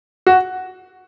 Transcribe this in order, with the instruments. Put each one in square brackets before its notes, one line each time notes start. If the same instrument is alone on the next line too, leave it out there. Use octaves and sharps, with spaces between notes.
[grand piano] F#4